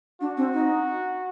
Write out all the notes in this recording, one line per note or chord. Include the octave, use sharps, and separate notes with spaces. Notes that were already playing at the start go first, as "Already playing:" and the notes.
D4 F#4
C4
D#4